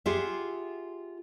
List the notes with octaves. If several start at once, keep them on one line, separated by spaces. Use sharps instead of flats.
F4 G4 G#4 E5 F#5